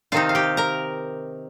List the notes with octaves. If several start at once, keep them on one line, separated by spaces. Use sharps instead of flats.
C3 D#3 C4 D#4 F4 F5
F5
G4 G5
A#4 A#5